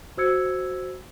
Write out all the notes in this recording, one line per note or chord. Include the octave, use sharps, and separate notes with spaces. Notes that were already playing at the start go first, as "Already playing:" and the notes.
F#4 C5 E6 G#6 C#7